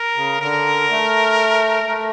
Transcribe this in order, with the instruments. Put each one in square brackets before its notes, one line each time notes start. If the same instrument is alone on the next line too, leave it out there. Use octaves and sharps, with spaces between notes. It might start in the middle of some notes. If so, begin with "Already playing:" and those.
Already playing: [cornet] A#4
[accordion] C#3
[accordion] D3 [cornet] A#4
[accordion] A3
A3